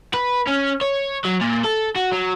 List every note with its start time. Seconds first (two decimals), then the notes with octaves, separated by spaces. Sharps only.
0.14 B4
0.47 C#4
0.81 C#5
1.24 F#3
1.41 A#2
1.64 A4
1.96 F#4
2.13 F#3